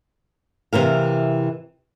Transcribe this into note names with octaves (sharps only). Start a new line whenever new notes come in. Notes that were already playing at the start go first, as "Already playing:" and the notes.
C3 E3 A#4 F5